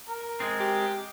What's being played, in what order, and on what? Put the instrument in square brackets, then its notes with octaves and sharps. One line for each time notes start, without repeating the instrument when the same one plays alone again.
[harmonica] A#4
[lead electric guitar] G#3 C4
[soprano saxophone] G4